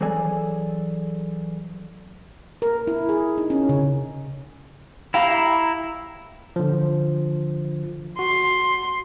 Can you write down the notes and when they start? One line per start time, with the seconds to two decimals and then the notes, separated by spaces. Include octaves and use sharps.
0.01 E3 F#3 G#4 A4 D5 G#5
2.62 A#4
2.87 E4
3.09 G#4
3.38 D#4
3.50 C#4
3.69 C#3
5.14 E4 G4 F5 G5 A#5
6.56 D3 F3
8.19 F#4 C6